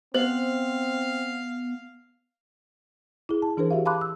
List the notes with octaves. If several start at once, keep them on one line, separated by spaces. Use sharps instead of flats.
B3 C4 C5 F5
E4 G#4
A5
E3 D4 G#4 A#4 C5
F#4 G4 E5 F5
F5 A5 B5 C6 D6 F#6
E6